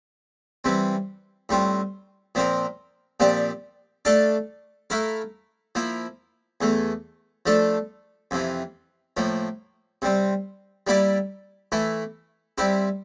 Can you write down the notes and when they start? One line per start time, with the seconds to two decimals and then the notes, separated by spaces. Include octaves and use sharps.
0.64 C3 E3 G3 C4
1.49 A2 G3 C4 F4
2.35 A#2 F3 C4 F4 A#4
3.20 A#2 F3 C4 G4 D5
4.05 A3 D4 A4 D5 F5
4.90 A3 E4 A#4 F5
5.75 F3 A#3 E4
6.61 E2 E3 A3
7.46 F3 A3 D4 A4
8.31 F2 C3 E3
9.17 A2 F3 A#3
10.02 C3 G3 C4
10.87 G3 A#3 E4 G4 D5
11.72 E3 A3 E4
12.58 G3 C4 E4 G4